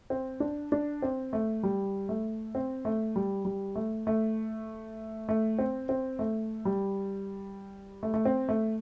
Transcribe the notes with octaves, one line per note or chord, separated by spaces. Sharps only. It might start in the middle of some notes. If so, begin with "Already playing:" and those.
C4
D4
D4
C4
A3
G3
A3
C4
A3
G3
G3
A3
A3
A3
C4
C4
A3
G3
A3
A3
C4
A3